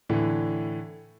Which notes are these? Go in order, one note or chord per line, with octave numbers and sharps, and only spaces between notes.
A2 D3 E3